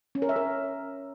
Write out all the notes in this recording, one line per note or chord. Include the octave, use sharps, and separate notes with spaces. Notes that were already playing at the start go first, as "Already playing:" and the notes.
C#4
A#4
E5
A#4